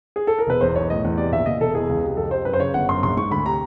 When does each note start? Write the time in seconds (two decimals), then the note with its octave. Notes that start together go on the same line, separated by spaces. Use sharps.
0.16 G#4
0.27 A4
0.39 A#4
0.47 E1 B4
0.61 E2 C5
0.75 B1 C#5
0.89 A2 D#5
1.04 E2
1.18 C3 D5
1.32 A#1 E5
1.46 A#2 D#5
1.60 E1 A4
1.75 E2 G#4
1.89 C#2
2.04 C3
2.17 F2 A4
2.31 C3 C5
2.45 F#2 B4
2.54 C5
2.59 C#3 C#5
2.74 G1 F#5
2.88 F#2 C6
3.03 A#1 C6
3.17 G#2 C#6
3.31 D2 B5
3.46 C3 A#5